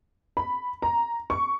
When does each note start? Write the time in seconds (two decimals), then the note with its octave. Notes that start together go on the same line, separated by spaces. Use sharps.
0.37 B5
0.82 A#5
1.30 C#6